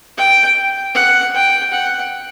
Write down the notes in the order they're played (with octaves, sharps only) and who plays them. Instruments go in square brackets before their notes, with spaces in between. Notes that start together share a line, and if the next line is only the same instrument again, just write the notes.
[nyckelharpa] G5
F#5
G5
F#5